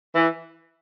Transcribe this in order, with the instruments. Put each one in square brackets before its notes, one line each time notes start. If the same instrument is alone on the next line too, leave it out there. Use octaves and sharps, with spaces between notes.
[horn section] E3